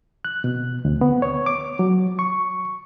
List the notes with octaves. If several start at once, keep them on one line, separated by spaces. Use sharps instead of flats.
F#6
B2
D2
B3
C#5
D6
F#3
C#6